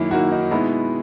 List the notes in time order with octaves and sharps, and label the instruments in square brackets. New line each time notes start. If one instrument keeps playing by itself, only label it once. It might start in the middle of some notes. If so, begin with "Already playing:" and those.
Already playing: [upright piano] F#2 D#3 A#3 [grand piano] E4
[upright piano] F#2 D#3 A#3 [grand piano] F#4
[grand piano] D#4
[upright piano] B2 G#3 B3 D#4 [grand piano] E4